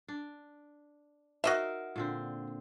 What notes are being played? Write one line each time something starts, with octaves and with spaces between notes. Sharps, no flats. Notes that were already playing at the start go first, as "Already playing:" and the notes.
D4
D#4 F#4 A#4 C5 D#5 E5
A#2 D3 C4